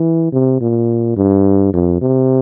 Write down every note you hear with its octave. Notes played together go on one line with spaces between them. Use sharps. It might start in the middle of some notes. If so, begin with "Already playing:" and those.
Already playing: E3
C3
A#2
G2
F2
C3